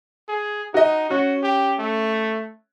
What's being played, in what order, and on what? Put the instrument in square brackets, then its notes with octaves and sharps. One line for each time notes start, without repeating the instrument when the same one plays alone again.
[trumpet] G#4
[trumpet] D#4 [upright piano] F#4 D#5
[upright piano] C#4 [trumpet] F#4
[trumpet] G4
A3